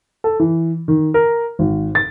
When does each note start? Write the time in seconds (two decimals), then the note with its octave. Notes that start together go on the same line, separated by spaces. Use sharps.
0.24 A4
0.40 E3
0.88 D#3
1.14 A#4
1.59 G#1
1.95 A6